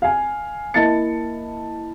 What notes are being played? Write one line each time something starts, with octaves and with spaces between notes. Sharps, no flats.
F5 G#5
A#3 E4 D#5 A5 A6 C#7